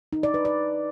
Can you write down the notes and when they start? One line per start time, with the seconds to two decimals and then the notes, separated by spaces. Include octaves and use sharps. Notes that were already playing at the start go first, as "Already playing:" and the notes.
0.13 D#4
0.23 D5
0.34 B4
0.45 D5